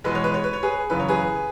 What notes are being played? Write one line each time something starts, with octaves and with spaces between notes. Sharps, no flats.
E2 B2 G#3 B4
C#5
B4
C#5
B4
C#5
G#4 B4
F#2 C#3 E3 B4
C#5
G#4 B4